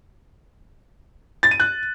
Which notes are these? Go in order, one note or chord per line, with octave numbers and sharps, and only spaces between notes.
A6
D#7
F#6